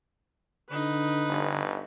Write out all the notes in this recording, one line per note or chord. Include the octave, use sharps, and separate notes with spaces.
D3 D#4 B4
G1